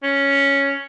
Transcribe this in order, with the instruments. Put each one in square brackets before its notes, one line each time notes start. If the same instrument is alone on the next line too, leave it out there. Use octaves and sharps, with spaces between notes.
[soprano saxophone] C#4